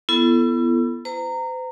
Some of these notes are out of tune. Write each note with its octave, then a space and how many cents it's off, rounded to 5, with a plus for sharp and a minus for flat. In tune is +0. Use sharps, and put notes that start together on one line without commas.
B3 +0 E4 +35 A4 +0
C5 -45 A#5 -15